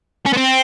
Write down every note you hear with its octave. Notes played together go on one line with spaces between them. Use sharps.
C#4
B3
C4